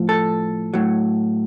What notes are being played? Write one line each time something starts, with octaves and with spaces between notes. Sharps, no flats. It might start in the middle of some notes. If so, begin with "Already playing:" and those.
Already playing: A2 F3
A4
A2 F#3